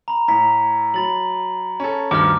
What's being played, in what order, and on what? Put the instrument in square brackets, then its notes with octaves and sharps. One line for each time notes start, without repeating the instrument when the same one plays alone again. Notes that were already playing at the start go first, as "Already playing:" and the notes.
[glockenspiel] A#5 B5
[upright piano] A2 [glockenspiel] A#5 B6
[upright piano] F#3 [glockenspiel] B5 A6 F#7
[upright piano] C#4 A4
[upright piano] D2 G2 D#3 [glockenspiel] D6 F6